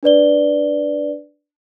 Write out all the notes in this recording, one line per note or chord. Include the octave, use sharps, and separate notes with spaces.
D4 B4 D5 G7